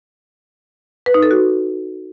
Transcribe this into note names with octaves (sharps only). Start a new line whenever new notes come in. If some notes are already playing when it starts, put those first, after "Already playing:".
B4
D#4
A4
F#4